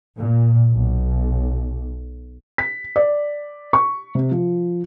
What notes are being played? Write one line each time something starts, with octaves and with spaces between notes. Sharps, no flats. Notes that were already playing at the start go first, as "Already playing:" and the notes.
A#2
B1
B6
D5
C#6
C3
F3